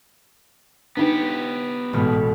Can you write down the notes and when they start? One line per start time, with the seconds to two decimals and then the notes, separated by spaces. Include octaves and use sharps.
0.97 B3 D4 D#4 G4 B4
1.93 A1 G#2 B2 F6